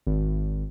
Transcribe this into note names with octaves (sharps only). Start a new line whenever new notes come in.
G#1